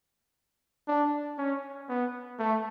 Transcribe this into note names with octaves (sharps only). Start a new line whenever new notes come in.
D4
C#4
B3
A3